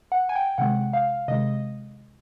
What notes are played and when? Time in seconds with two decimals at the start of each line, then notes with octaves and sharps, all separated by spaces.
0.12 F#5
0.29 G#5
0.36 G5
0.58 C3 D#3 G#3 F#5
0.93 F5
1.28 C3 D#3 G#3 D#5